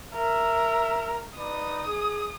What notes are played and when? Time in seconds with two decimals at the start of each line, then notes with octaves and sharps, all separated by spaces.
0.15 A#4 E5
1.37 D#4 B4 D5 D#6
1.86 G#4